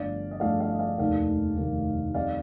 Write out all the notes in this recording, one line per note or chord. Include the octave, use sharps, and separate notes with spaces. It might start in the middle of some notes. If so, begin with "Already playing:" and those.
Already playing: G1 G2 F3 A3 D5 F5
D#5
G1 G2 F3 A3 D5 F5
D5 F5
D#5
D5 F5
F1 D#2 D#3 A3 D5 F5
F1 D#2 D#3 A3
F2 D#3 G3 D5 F5